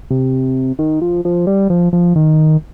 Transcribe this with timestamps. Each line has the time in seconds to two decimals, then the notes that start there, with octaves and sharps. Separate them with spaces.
0.10 C3
0.79 D#3
1.02 F3
1.25 F3
1.47 G3
1.70 F3
1.93 F3
2.16 D#3